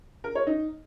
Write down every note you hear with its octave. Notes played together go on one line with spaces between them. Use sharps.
A#4
C#5
D#4